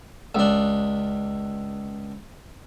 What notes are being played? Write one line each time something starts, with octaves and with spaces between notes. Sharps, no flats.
C#2 D4